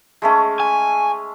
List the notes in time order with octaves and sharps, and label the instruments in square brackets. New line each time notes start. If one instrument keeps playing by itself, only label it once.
[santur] G#3 A3 C#4
[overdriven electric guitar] G#5